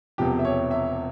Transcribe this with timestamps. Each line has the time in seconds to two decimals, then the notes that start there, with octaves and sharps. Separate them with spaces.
0.18 E1 E2 C3 F3 G4
0.39 E5
0.45 C#5
0.71 E5